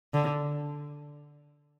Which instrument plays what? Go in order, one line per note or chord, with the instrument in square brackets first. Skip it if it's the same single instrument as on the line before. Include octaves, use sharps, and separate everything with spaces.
[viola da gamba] D3